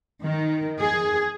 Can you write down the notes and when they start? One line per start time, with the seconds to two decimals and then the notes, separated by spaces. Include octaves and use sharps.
0.24 D#3
0.80 G#4